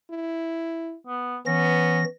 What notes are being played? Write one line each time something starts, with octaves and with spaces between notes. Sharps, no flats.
E4
B3
E3 B3 C#4 A#6